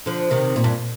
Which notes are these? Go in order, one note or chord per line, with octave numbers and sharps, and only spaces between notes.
D3 F3
C3 D#3
A#2
G2